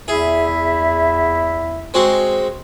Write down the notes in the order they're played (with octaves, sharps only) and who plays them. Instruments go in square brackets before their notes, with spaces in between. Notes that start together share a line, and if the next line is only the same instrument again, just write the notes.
[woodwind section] E2 E4 E5 [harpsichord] G#4
[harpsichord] G#3 C4 F#4